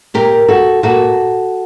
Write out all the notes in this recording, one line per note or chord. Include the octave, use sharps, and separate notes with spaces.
A#2 G4 A#4
F#4 A4
A#2 F#4 A4